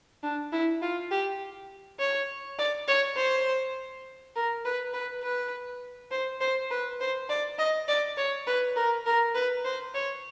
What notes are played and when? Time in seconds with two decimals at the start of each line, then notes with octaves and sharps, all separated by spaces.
0.23 D4
0.52 E4
0.82 F4
1.11 G4
1.99 C#5
2.58 D5
2.88 C#5
3.17 C5
4.36 A#4
4.65 B4
4.94 B4
5.23 B4
6.11 C5
6.41 C5
6.71 B4
7.00 C5
7.29 D5
7.59 D#5
7.88 D5
8.17 C#5
8.47 B4
8.76 A#4
9.06 A#4
9.35 B4
9.65 C5
9.94 C#5